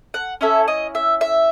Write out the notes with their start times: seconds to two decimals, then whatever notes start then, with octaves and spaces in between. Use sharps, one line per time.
0.14 F#5
0.41 C#4 E4 A4 E5
0.68 D#5
0.95 E5
1.21 E5